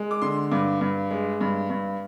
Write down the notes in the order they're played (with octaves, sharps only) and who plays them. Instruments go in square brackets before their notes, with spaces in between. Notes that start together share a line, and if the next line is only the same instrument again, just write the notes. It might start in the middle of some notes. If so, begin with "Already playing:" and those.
Already playing: [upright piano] G#3
D6
D3 C6
G2 D6
G2
G#3
G2
G2